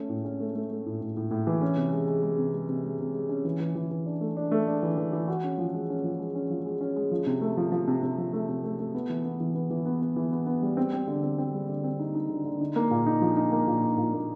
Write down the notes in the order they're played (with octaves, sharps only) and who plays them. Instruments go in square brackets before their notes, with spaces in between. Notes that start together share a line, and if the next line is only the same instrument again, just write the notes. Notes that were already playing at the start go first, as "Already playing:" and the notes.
Already playing: [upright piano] A3 C#4
A2
C#4
A3
A3
A3
A2
A2
A2
A2
E3
C#4
C3
G#3
G#3
G#3
C3
G#3
C3
G#3
C3
G#3
C#4
E3
E3
E3
E3
D4
A3
D4
A3
D4
E3
E3
E3
F#4
C#4
F3
G#3
C#4
F3
G#3
C#4
F3
G#3
C#4
G#3
F3
C3
A3
F3
F3
C3
C3
F3
A3
C3
A3
A3
B3
E3
B3
E3
B3
E3
B3
B3
E3
B3
B3
G3
C4
C4
D3
C4
C4
G3
D3
C4
D#4
D#4
D3
D3
D#4
A#3
A#2
D#4
F3
D#4
A#3
A#2
D#4
A#2
A#3